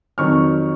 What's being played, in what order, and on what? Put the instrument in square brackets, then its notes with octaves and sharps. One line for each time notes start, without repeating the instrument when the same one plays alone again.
[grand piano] F2 D#3 F#3 C#6 F6